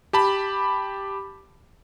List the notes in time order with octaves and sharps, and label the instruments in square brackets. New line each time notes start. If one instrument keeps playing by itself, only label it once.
[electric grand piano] G4 A5 B5